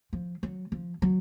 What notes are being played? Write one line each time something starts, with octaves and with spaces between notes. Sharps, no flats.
F3
F#3
F3
F#3